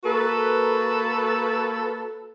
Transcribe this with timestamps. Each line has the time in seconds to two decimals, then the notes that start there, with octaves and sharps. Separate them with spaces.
0.04 A#3 F#4 A4 B4